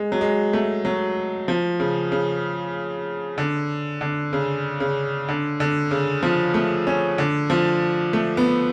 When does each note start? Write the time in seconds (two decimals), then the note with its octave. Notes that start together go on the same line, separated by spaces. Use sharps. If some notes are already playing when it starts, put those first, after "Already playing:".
Already playing: G#3
0.12 F#3
0.21 G#3
0.53 A3
0.85 F#3
1.48 F3
1.80 C#3
2.12 C#3
3.38 D3
4.01 D3
4.33 C#3
4.80 C#3
5.29 D3
5.60 D3
5.91 C#3
6.23 F3
6.54 A3
6.87 C#4
7.18 D3
7.50 F3
8.13 A3
8.37 B3